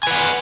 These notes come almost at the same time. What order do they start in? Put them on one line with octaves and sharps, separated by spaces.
G#5 B4 F#5